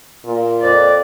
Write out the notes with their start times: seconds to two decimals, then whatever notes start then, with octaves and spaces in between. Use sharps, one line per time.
0.24 A#2
0.62 F2 D5